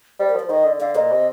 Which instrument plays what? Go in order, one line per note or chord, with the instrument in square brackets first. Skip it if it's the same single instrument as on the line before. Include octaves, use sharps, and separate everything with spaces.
[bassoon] G3 [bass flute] C5
[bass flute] A#4
[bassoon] F3
[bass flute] C5
[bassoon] D#3 [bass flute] D#5
[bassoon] D3
[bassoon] D3 [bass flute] F5
[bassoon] A#2 [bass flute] D#5
[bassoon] C3